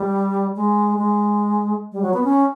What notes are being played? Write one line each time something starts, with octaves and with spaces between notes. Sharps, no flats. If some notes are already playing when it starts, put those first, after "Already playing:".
Already playing: G3
G#3
G#3
G3
F#3
B3
C#4